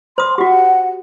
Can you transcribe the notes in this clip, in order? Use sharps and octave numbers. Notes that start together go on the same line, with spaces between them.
C5 C6 D#6
F#4 G4 F#5